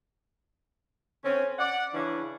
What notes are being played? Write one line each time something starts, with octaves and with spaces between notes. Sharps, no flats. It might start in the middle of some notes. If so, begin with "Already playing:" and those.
D3 C4 C#4
D5 F#5
C#3 E3 C#4 D4